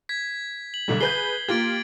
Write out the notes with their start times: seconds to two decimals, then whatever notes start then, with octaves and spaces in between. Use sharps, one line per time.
0.09 G#6 B6
0.74 F#7
0.88 B1 D3 G3
1.00 G#4 B4 G6 C7 G7
1.48 A#3 F4 G4 G#6 A6 D7